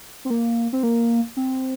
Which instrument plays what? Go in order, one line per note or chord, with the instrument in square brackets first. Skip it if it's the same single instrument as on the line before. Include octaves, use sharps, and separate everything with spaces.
[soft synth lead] C4
A#3
C4
A#3
C4